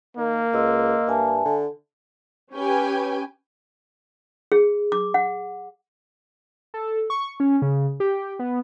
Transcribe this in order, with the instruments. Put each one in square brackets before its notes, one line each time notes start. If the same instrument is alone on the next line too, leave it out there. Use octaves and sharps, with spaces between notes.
[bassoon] D#3 [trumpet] A#3
[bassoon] C#2 [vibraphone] D#5 C6 E6
[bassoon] G2 [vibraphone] E5 G#5 A5
[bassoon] D3
[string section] C#4 G4 B4 G5 G#5
[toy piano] G#4
D6
F#5
[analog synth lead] A4
C#6
C#4
C#3
G4
B3